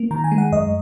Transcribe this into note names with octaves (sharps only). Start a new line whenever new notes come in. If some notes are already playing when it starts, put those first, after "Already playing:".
Already playing: A#3
D#3 A#5
G#5
G#3
F#5
F#2 D#5